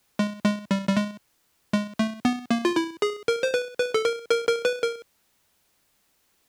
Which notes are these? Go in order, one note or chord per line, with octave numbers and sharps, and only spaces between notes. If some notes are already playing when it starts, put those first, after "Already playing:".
G#3
G#3
G3
G3
G#3
G#3
A3
B3
A#3
F4
E4
G#4
A#4
C5
B4
B4
A4
A#4
A#4
A#4
B4
A#4